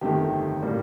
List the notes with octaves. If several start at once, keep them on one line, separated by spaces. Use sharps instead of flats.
G1 F2 D#3 A3 G4
A2 G3 A#3